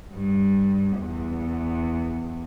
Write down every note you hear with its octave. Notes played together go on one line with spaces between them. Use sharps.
G2
E2